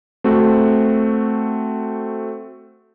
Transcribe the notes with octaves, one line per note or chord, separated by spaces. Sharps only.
A3 C4 F#4